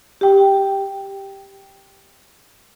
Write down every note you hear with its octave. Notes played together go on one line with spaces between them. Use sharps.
G4 G5